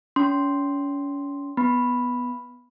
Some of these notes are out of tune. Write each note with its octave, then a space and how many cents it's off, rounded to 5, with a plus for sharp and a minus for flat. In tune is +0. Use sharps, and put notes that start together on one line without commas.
C#4 +35 C6 +0
B3 +0 B5 +0